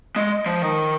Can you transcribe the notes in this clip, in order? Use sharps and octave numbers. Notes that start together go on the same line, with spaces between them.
G#3
F3
D#3